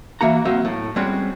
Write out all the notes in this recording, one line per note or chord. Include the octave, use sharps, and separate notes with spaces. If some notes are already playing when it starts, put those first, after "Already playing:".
E3 A#3 F#4 A#5
F#3 A#3 C4 C#5 E5
A2
G3 G#3 C4 C#4 F#4